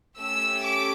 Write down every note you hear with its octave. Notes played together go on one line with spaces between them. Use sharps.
A3 C#4 G4 E6
D6